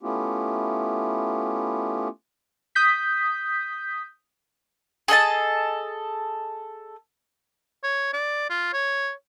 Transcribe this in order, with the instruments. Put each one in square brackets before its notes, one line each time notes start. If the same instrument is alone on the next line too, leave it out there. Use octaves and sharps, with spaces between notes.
[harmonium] A3 B3 C#4 E4 F4 G4
[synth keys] D#6 G6 B6
[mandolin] G#4 A4 D#5 A5
[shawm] C#5
D5
F4
C#5